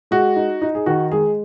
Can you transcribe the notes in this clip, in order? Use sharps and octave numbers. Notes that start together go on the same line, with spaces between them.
G#3 F#4
D#4
D#4
G#4
D#3 F#4
G#3 G#4